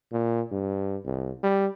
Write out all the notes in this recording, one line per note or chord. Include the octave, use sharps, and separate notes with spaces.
A#2
G2
C2
G3